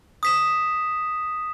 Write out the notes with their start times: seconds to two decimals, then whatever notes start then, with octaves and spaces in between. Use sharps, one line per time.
0.23 D#6 B6 E7